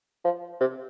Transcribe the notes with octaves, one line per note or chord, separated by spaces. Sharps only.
F3
C3